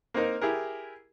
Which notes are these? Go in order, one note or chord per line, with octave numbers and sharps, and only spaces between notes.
A#3 C4 D#4 A#4
E4 G4 G#4 A#4